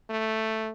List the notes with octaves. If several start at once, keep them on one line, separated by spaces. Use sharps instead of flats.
A3